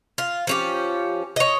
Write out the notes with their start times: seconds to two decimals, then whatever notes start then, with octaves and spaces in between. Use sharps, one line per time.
0.18 F4
0.47 F3 C#4 G4
1.36 C#5 D#5